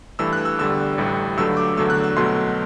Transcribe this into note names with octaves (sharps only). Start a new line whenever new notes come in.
G2 E3 A3 E6
F#6
E6
E2 D3 G3 E6
A1 A2 G3
G2 D3 F#3 A3 E6
D6
E2 D3 F#3 A3 E6
F#6
E6
C2 B2 F#3 A3 C6